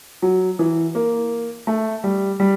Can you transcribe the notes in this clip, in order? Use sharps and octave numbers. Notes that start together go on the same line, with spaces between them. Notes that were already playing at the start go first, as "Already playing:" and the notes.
F#3
E3
A#3
A3
G3
G3